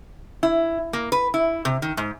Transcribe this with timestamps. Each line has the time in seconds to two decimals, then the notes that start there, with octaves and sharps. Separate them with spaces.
0.43 E4
0.93 A#3
1.12 B4
1.34 E4
1.65 C3
1.82 D#3
1.97 G#2